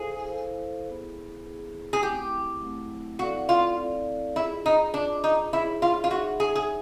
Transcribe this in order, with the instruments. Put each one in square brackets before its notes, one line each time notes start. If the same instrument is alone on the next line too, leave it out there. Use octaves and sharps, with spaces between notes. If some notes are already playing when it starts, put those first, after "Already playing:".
Already playing: [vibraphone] E4 A4 C5 F5 [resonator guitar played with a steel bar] G#4
[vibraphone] E4 A4 C5 F5
B3 E4 G#4 B4
B3 E4 G#4 B4
[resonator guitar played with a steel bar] G#4
[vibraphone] F#3 A3 C4 E4 [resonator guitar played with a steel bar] G4
[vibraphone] F#3 A3 C4 E4
[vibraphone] C4 E4 A4 D5 F5 [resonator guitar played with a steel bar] F#4
[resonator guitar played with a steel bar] F4
[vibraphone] C4 E4 A4 D5 F5
[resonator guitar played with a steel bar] E4 [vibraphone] F4 G#4 B4 D#5
[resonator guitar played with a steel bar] D#4
[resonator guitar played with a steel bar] D4 [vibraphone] F4 G#4 B4 D#5
[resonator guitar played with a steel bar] D#4
[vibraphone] D#4 G#4 C#5 E5 [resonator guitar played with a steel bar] E4
[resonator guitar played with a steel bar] F4
F4
[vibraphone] D#4 G#4 C#5 E5 [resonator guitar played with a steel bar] F#4
[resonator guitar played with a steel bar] G#4
G#4